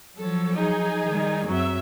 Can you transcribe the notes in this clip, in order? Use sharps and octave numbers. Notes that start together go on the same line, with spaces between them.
F3 F#3 A4 C#5
D#4 G#4 G#5
D#3 G3
F#2 F#3 C4 E5